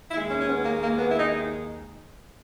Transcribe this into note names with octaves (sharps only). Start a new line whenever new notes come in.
D#2 D#3 G#3 E4
C#4
C#4
B3
A#3
A#3
B3
E4
D#4